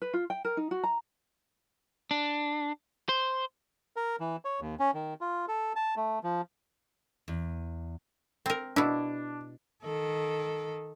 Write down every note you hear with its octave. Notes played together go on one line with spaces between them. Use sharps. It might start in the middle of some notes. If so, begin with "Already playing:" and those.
B4
F4
G5
A#4
D#4
F#4
A#5
D4
C5
A#4
E3
C#5
D#2
C#4
D#3
F4
A4
A5
A3
F3
E2
C4 A#4
B2 D4 E4
D#3 A4